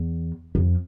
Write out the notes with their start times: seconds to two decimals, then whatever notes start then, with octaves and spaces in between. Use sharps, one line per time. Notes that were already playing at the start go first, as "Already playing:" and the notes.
Already playing: E2
0.55 F2